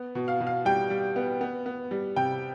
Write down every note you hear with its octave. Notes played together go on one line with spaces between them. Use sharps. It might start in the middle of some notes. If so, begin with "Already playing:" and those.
Already playing: B3
B2
F5
B2
F5
G3 G5
G3
B3
B3
B3
G3
C3 G5